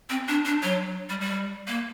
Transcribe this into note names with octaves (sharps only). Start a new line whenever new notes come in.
C4
D4
D4
F#3
G3
G3
A#3